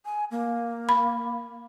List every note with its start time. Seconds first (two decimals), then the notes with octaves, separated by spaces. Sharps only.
0.05 G#5
0.31 A#3
0.89 B5